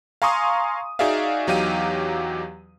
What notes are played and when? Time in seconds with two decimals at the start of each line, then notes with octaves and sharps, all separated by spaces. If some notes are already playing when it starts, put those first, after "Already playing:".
0.22 F5 G#5 A#5 C6 C#6 D#6
0.99 D#4 F#4 G#4 D5 E5 F5
1.47 E2 F#3 D#4 G4 F5 D#7